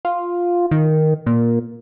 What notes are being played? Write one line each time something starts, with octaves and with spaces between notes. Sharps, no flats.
F4
D#3
A#2